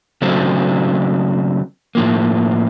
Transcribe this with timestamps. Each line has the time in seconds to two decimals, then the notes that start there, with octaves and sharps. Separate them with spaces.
0.22 C#3 F#3 A3 C4
1.95 A2 F3 A#3